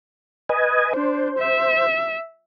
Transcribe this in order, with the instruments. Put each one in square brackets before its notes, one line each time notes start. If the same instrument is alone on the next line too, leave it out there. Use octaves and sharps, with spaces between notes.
[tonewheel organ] B4 D#5 G#5
[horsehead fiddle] D4 [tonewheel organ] C5
[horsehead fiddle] E5